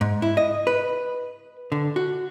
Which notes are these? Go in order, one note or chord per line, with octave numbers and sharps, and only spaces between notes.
G#2
E4
D#5
B4
D3
F#4